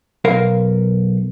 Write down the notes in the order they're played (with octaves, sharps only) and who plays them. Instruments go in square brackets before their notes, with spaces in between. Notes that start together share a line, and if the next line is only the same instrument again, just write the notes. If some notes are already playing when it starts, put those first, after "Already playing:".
[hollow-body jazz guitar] B1 A#4 F5